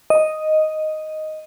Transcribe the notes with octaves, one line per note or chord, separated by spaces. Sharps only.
D#5